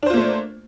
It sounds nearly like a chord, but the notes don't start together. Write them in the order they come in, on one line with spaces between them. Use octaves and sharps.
D4 C5 F4 A#3 A3